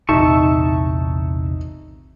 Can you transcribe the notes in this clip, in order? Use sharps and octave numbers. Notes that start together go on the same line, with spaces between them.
A#1 E2 C3 D#4 E5 A5 C#6